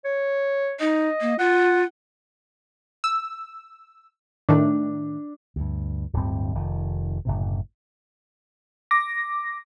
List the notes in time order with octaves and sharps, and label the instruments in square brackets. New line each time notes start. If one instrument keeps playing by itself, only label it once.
[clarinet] C#5
[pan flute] D#4 [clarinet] D#5
[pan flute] A#3
[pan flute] F4 [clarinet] F#5
[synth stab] E6
[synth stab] A2 D#3 A3 [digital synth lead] D4
[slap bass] D2 G2
D1 D2 G2 C4
F1 D#3
F#1 A2 C3
[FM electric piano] D6 A#6